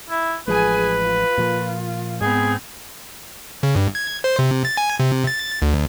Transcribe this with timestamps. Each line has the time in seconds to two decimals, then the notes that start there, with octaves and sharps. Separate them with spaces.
0.10 E4
0.48 A1 F3 G#3 G#4 B4 G#5
1.03 F4
1.38 A#2 F3 A#3
2.21 G#2 B3 C4 G#4
3.63 C#3
3.76 G2
3.95 G#6
4.24 C5
4.39 C3
4.65 A6
4.77 G#5
5.00 C3
5.27 A6
5.62 D2